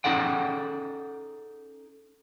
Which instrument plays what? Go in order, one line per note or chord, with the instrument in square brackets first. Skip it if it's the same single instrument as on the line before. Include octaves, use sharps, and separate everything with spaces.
[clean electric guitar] C#4 D#4 G#4 A4 F#5 G5